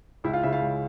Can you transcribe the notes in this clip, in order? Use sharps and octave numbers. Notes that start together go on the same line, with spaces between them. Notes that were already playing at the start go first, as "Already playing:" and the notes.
C#2 E4 E5
F4 F5
C#3 E4 E5
F4 F5
C#2